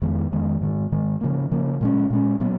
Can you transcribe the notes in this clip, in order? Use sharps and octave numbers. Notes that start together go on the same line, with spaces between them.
F2 D#3 G#3 B3
F2 D#3 G#3 B3
G#2 D#3 G#3
G#2 D#3 G#3
C#3 F3 A#3
C#3 F3 A#3
A#2 G#3 C#4
A#2 G#3 C#4
A#2 F#3 B3